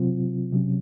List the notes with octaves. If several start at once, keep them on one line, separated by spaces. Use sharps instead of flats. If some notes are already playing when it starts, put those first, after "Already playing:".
Already playing: C3 F#3 C4 F4
C3 F#3 C#4